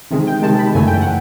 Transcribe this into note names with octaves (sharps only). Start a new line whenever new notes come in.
C3 D#3 G#3
G5
C3 D#3 G#3 A5
B5
F#2 C#3 E3 A3 G#5
G5
F#5